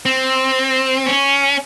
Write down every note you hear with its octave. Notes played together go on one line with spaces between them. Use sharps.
C4
C#4